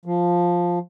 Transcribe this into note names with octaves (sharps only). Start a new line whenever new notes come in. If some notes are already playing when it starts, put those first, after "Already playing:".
F3